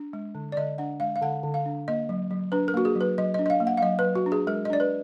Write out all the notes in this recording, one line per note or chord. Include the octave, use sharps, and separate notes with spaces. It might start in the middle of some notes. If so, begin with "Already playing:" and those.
Already playing: D4
G#3
D3
D5
D3 D#5
D4 F#5
G#3 F5
F5
D3 F#5
D3
F5
D4
A#3 D#5
F#3
F#3
D4 B4
A#4
A#3 F#4
G#4
F#3
B4
F#3 D#5
D#5
D4
D#5
F5
A#3
F#5
F5
F#3 D#5
B4
F#3
F#4
D4
G#4
G#3 A#4
D#5
D4 D5
B4